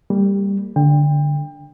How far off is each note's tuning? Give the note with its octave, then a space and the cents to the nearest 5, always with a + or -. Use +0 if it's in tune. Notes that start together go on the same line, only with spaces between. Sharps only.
G3 +15 A#3 -35
D3 +0 G5 +25